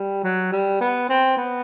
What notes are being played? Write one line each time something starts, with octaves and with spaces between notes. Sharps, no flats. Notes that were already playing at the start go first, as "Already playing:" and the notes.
Already playing: G3
F#3
G3
B3
C4
B3